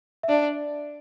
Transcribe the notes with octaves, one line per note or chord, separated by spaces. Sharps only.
E5
D4 D5